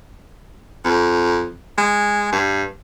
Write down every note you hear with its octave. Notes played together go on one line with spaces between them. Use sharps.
F2
G#3
G2